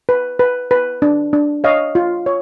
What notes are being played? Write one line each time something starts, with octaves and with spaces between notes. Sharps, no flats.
B4
B4
B4
D4
D4
C#5 D#5 F5
F4
C#5